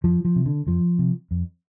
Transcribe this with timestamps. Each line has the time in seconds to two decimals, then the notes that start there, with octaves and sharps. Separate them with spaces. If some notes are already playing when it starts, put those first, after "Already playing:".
0.04 F2 F3
0.25 F3
0.36 C3
0.46 D3
0.67 F2 F3
0.99 C3
1.31 F2